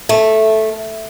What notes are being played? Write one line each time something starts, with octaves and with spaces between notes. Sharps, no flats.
A3